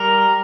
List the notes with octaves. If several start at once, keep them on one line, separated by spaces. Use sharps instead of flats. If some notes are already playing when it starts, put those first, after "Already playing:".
Already playing: G3 A#4